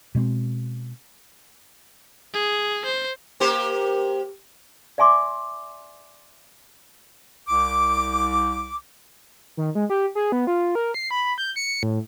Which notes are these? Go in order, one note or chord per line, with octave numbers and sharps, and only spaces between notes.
B2 G#3 C4
G#4
C5
A#3 G4 C5
D5 E5 G#5 C6 D6
C2 D6
D#3
G#3
G4
G#4
B3
F4
A#4
C7
B5
G6
C#7
A2